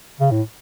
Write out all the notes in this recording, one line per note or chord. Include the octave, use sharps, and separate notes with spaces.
C#3
A2